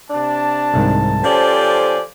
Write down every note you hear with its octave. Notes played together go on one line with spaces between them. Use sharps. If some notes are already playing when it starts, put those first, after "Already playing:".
C3 D4 A5
C2 G#2 D#3
F3 C#4 G4 A4 C5 D5 G#5